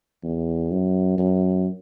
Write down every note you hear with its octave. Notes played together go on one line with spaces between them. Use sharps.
E2
F#2
F#2